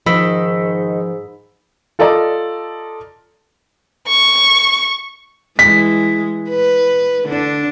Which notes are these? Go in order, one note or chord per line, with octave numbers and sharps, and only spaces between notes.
G#2 D#3 F3 B5 E6 B6
F4 A4 D5 D#5 A#5
C#6
E3 G#3 B6
B4
D3 D4